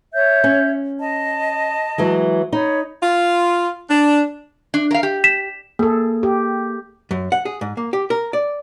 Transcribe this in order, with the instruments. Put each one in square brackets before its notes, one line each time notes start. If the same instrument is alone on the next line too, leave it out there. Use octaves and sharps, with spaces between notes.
[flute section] C#5 E5 G6
[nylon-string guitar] C#4
[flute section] D#5 A5
[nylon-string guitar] E3 F#3 G#3
[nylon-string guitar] D#4 [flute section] C#5 B5
[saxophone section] F4
D4
[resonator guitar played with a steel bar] D4
A#4 F5
G4
[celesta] B6 E7
[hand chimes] A#3 [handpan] G#4 A4
[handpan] G4
[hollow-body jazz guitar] F#2
F#5
G#4
G#2
A#3
G4
A#4
D5